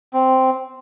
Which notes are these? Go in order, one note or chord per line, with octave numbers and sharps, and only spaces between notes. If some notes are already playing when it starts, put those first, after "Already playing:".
C4